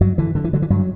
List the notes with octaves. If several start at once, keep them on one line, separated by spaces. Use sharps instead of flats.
G2 F#3
D3 E3
G2 D3
E3
D3 F#3
E3
G2 F#3